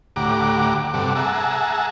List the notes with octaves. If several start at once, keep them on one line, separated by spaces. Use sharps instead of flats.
D2 A2 G4 F#5 A#5 D6
G2 C3 A4 F#5 D6
G#4 E5 F#5 A5 A#5